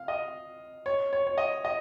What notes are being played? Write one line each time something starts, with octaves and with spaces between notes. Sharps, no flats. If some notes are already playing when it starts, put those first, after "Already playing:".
Already playing: F5
D#5
C#5
C#5
C#5
D#5
D#5